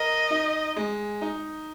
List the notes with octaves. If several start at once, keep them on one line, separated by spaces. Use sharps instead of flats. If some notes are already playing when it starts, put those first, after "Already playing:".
Already playing: A#4 D#5
D#4
G#3
D#4